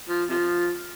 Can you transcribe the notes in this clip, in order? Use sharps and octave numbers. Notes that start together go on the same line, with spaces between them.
F3
C3 F3